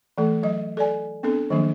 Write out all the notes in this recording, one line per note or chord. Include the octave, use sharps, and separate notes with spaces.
E3 A3 A4
F#3 D#5
A4 D5 G#5
B3 C4 D4 A4
D#3 F3 F#3 A#3 D4